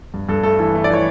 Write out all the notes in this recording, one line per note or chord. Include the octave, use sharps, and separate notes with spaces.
G2
G2 A4
A3 A4
E3 A4
A3
D5
E3 C#5